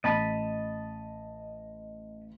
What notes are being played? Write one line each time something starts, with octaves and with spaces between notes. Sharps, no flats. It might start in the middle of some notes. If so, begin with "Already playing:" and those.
A1 D#5 A5 B5